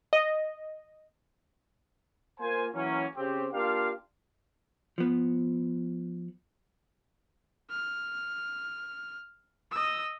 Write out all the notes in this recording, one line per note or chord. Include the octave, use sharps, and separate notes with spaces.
D#5
A#3 F4 C5 G#5
E3 F#3 A#3 C#4
C#3 C4 G4
A#3 D4 F4 G4 A#4 F5
F3 B3
F6
D#5 E6